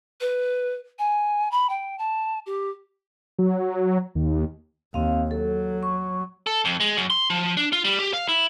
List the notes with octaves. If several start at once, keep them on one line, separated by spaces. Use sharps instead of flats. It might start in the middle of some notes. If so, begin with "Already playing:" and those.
B4
G#5
B5
G5
A5
G4
F#3
D#2
D#2 C4 F5
F#3 A4
C#6
A4
F2
G#3
F#2
C6
F3
D4
F4
G3
G4
F5
E4